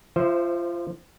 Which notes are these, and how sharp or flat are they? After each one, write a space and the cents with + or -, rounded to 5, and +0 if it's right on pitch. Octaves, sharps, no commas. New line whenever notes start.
F3 -25 C5 +0 E5 +0